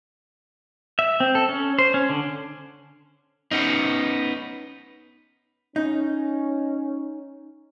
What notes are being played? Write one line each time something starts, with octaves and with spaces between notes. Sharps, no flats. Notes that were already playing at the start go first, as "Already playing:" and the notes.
E5
C4
A4
C#4
C5
C#4
D3
B3 C#4 D#4
C#4 D#4